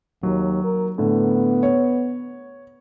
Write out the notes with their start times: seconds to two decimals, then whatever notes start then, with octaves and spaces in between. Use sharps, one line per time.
0.23 D#2 F#3
0.64 A#4
0.98 A2 D3 B3
1.63 C#5